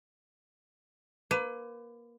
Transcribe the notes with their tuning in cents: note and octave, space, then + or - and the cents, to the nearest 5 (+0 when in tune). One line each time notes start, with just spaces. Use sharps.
A#3 +20 B4 +30